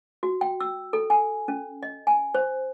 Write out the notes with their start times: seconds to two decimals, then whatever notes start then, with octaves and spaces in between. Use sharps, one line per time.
0.23 F#4
0.41 G5
0.60 E6
0.93 A4
1.10 G#5
1.48 C#4
1.83 D#5
2.07 G#5
2.35 C5